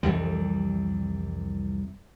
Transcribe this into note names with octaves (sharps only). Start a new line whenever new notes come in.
C2 F2 E3 G3